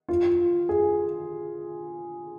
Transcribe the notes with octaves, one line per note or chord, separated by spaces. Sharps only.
F4
G#4